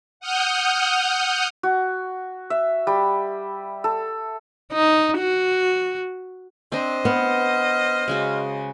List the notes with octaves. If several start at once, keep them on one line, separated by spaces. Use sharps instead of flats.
F#5 D#6 F6 G6
F#4
E5
G3
A4
D#4
F#4
C4 D4 C5 D#5
B3 F6
C#3 G#3 F#4